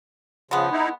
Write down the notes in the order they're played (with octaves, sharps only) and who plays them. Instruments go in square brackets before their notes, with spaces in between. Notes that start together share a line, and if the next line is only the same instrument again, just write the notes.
[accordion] C#3 F3 [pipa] G#3 B3
[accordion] D#4 E4